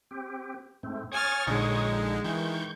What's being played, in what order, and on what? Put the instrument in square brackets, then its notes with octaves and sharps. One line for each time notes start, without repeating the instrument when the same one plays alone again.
[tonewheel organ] C4 G4
G#2 A3 C4
[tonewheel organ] C#5 C#6 D#6 [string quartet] G#5 F6 A6
[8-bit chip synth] A#1 D3 D#4 [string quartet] G#3
[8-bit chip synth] D#3 E3 [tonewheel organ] C#6 G6